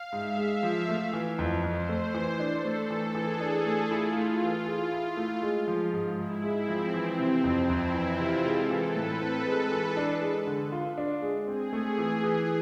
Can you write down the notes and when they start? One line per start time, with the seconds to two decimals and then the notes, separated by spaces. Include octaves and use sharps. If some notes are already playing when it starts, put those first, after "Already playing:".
Already playing: F5
0.12 G#2 E5
0.38 G#3
0.63 F3
0.88 A3
1.13 E3
1.39 F2
1.64 F2 C5
1.89 A3
2.14 E3
2.40 D4 A4
2.65 A3
2.78 A4
2.90 E3
3.15 E3 G#4
3.41 D4
3.54 A4
3.66 A3
3.91 E4 F4
4.16 A3
4.42 E3
4.66 G#4
4.92 E4
5.17 A3
5.42 G#3
5.68 F3
5.93 G#2
6.17 G#2 E4
6.44 G#3
6.56 C4
6.68 F3
6.94 E3 C4
7.19 C3
7.44 F2
7.70 F2 E4
7.95 E3
8.07 F4
8.20 C3
8.45 G#3 A4
8.71 E3
8.83 B4
8.96 A2
9.21 C4 A4
9.46 G#3
9.72 E3
9.97 D4
10.21 G#3
10.47 D3
10.72 F4
10.98 D4
11.22 G#3
11.48 C4 G#4
11.73 A3
11.98 E3
12.24 E3